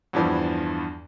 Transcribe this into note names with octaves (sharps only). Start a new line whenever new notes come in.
E2 G2 E3 F3